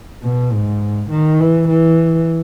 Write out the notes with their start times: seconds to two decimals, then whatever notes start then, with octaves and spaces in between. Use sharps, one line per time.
0.23 B2
0.52 G#2
1.11 D#3
1.40 E3
1.68 E3